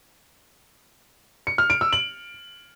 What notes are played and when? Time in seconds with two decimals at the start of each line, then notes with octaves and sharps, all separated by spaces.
1.47 C#7
1.58 F6
1.70 D7
1.81 E6
1.93 F#7